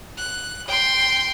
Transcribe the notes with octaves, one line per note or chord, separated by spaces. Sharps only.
F#6
G5 C6